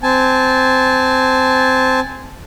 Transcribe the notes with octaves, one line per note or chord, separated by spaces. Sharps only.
C4 G#5 A5